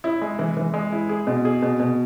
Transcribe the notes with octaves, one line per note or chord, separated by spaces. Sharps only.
E4
G#3
E3
E3
G#3
E4
G#4
B2
G#4
B2
B2